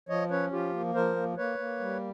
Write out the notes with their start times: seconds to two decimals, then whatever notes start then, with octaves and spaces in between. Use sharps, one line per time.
0.09 F3 C#5 D#5
0.30 C#4 B4 C#5
0.52 F3 F4 G4
0.73 A#3
0.94 F3 A#4 C5
1.16 A#3
1.37 A#3 B4 C#5
1.58 A#3
1.80 G3